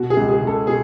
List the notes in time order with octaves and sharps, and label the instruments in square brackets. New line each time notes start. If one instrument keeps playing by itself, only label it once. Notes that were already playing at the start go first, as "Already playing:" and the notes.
Already playing: [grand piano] B2 F#4
G#4
C#2
G#4
C#2
A4
B2 G#4